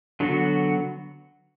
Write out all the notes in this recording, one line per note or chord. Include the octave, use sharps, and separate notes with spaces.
D3 F#3 B3 F#4